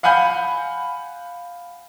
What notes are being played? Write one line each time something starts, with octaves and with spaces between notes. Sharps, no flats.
F5 F#5 G#5 B5 G6